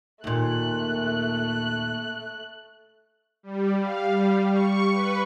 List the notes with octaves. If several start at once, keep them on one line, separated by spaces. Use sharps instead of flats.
D#2 A#2 A3 F#6
G3
F5
G3
C#6
B4